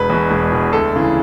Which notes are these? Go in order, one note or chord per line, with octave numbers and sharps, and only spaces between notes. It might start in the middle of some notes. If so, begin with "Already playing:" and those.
Already playing: E1 B4
E2 B2
E1
E2 B2
D2 A4
C#3 E3